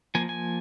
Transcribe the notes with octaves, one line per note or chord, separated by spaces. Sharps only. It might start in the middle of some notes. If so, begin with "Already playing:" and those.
F3 A#3 G#5
G#5